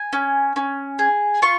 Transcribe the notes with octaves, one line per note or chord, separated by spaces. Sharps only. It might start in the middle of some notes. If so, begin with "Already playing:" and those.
Already playing: G#5
C#4
C#4
G#4
F4 C#6